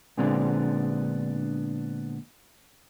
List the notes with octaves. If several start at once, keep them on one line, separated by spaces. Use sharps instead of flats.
A#2 D3 G#3 B3 C4 D4